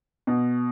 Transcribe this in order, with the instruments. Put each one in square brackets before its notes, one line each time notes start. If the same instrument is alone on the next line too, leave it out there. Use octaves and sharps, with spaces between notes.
[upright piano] B2